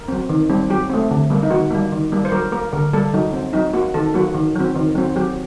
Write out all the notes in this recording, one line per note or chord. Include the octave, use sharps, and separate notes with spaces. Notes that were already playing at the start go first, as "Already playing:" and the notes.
Already playing: A#4
F#3 C4
D#3
G3 C4
F#3 G4
A3 C4
D3
G3 A#3
D#4
D#3 F#4
G3 A#3
D#3
G3 A#3
C5
F#3 A#4
A#3 A#4
D3 A#4
G3 A#3 A4
F#3 D#4
C4
F#3 D#4
A#3 F#4
D#3 A4
F#3 A#3 F#4
D#3
F#3 C4
D#3
F#3 C4
F#3 G4